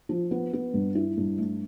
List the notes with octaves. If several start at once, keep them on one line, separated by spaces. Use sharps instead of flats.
F3
B3
B3
G2
E4
G2
A3